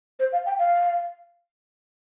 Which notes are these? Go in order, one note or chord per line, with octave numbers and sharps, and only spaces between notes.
C5
F5
G5
F5